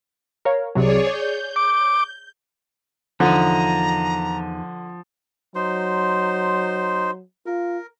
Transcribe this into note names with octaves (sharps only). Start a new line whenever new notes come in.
A#4 C#5 F5
C2 C3 F#3 G#4 C#5 D5
C#5 G6
D6
E2 D3 F3 D#4 A#5
F#3 D#4 C5 C6
F4 A#4